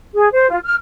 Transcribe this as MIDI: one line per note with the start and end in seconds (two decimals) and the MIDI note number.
0.12 0.29 68
0.32 0.48 72
0.50 0.59 65
0.64 0.74 89